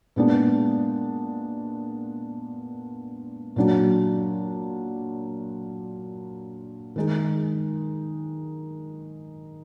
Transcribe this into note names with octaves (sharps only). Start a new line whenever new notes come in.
A#2 G#3 B3 D4
A#2 F#3 D4
D#3 G#3 D#4